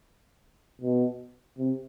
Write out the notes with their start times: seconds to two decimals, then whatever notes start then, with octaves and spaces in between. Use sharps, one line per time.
0.81 B2
1.58 C3